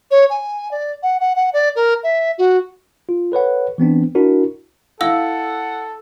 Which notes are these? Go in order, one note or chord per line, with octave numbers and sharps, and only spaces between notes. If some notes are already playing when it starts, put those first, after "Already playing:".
C#5
G#5
D5
F#5
F#5
F#5
D5
A#4
E5
F#4
F4
A4 B4 C#5 F#5
E3 B3 C4 D4
D4 E4 F#4 A#4
E4 A4 F5 F#5 E6